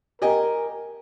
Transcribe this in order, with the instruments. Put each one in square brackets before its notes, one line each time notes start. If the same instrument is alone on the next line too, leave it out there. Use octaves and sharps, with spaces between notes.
[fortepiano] G4 D#5 G#5 [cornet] A#4